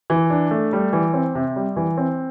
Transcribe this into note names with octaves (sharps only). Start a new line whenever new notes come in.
E3
D4
A3
G3
E3
C4
C3
G3
E3
C4